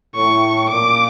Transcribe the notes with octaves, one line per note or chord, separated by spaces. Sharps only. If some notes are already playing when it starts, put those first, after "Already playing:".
A2 C#6
A#2 D6